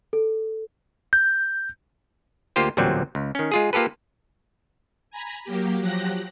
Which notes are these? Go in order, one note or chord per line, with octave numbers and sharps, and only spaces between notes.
A4
G6
D2 A#3 F4 G4 C5
A1 D2 A#2 F#3 G3 C4
C#2
D#3 C#4
G#3 F4 G#4
A#3 F4 G4 A4 B4
G#5 A#5 B5
F#3 A#3 G4
F3 F#3 G4 F#6 A#6